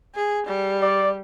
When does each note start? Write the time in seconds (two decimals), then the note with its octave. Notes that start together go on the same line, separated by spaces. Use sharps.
0.15 G#4
0.46 G3
0.82 D5